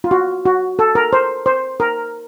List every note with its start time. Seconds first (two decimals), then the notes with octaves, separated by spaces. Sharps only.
0.04 F4
0.11 F#4
0.45 F#4
0.79 A4
0.95 A#4
1.13 C5
1.46 C5
1.80 A#4